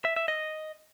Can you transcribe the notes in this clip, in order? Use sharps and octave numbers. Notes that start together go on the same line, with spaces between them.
E5
E5
D#5